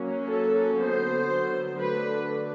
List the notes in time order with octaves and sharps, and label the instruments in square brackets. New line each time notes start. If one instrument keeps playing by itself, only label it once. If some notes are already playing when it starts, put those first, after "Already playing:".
Already playing: [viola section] F#3 A#3 C#4
A4
D3 F#3 B3 C5
D3 F#3 A3 D4 B4